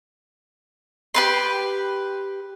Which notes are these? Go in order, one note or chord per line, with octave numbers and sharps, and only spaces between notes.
G4 B4 C6